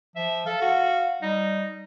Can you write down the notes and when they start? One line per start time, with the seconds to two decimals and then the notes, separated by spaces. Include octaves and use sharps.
0.16 F3 E5
0.46 A4 F5
0.61 F#4
1.22 G3 D#4